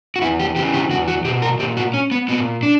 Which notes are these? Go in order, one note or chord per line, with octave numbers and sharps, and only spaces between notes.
F#4
E2 E4
G4
C#3 E3 G4
G4
E2 F#4
F#4
B2 G4
A#4
A#2 G4
F#4
C#4
B3
A#2 B3
D4